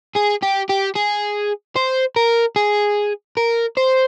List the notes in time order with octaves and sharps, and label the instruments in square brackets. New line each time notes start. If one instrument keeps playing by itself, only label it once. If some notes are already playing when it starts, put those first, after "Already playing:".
[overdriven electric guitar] G#4
G4
G4
G#4
C5
A#4
G#4
A#4
C5